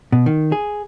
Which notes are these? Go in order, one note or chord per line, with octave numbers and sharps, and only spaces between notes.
B2
D#3
G#4